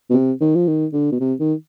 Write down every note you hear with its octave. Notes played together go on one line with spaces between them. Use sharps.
B2
C3
D#3
F3
D#3
D3
B2
C3
D#3